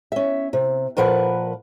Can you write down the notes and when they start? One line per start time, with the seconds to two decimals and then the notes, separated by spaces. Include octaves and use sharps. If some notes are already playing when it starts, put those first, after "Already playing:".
0.12 C#4 E5
0.53 C3
0.97 A#2 F3 A#4 B4 F#5